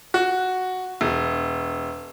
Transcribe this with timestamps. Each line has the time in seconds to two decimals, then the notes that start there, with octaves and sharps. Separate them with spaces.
0.14 F#4
1.01 E1